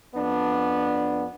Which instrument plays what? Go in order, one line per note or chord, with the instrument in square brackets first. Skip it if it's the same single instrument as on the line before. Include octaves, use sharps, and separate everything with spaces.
[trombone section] F2 B3 D4